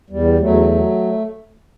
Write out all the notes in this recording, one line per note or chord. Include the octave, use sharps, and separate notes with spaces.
E2 G3
E2 F#3 A3
F#3